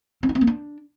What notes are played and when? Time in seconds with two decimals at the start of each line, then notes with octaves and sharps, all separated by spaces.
0.23 C4
0.29 D#4
0.35 C4
0.41 A#3
0.47 D4